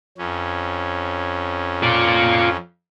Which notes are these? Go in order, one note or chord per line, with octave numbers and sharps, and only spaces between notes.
F2 C#4
F4 D5